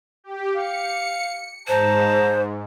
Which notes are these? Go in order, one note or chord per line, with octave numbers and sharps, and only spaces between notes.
G4
F5 C#7
G#2 C5 A5 A#5